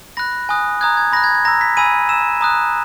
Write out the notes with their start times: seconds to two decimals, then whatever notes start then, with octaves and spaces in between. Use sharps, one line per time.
0.17 B5 F#6 A#6
0.49 G#5 D#6 F#6
0.81 A#5 D#6 F#6 G#6
0.97 G#6
1.13 B5 F#6 A#6
1.24 G#6
1.34 G#6
1.45 A#5 E6 A#6
1.61 B6
1.77 G#5 B5 E6 D#7
2.09 A#5 E6 E7
2.41 A#5 D#6 F#6